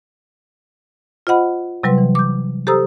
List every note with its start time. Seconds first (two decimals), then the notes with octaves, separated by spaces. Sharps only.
1.27 F4 C5 D#5 F#5 B5
1.83 C3 F#3 G3 B4 C6
1.98 E3
2.15 D6 G6
2.67 G4 A4 C5 A#5 D#6 E6